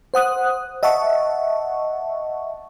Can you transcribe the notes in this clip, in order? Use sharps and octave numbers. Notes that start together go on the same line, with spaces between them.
C5 F#5 D#6 F#6
D#5 E5 F#5 A5 C#6